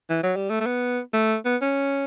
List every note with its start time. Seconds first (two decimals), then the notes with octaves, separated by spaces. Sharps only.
0.09 E3
0.23 F#3
0.36 G3
0.50 A3
0.60 A3
0.66 B3
1.13 A3
1.45 B3
1.62 C#4